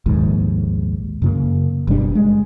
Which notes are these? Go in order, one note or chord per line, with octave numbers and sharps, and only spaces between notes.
A#1 D#2 G#2
F#2 C#3 A#3
F#1 B2 G3 D4
G#3